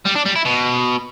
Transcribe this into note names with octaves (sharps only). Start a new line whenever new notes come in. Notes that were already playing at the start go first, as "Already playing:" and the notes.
G3
D4
G3
E4
B2